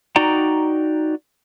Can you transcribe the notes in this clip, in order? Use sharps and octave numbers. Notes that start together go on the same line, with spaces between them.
D#4 F#4 D5 G5 A#5